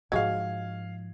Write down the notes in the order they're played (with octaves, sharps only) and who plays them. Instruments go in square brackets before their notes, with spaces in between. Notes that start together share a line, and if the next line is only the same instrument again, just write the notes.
[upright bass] G#2 F3 [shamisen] F#3 G#3 [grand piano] F5 G#6